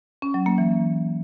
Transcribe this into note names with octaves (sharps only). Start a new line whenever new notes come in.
C#4
F#3
A#3
E3